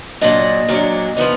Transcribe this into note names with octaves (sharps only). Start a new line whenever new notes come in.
A#2 F#3 D4 D#5
A#2 F#3 D4
F3 B3 D#4